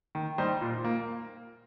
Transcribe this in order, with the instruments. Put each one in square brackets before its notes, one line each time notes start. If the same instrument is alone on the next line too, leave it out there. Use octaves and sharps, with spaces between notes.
[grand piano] D#3
G3 D#4 C5
A#2
A#3